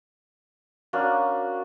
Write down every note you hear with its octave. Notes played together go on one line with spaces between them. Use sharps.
A#3 C#4 D4 F#4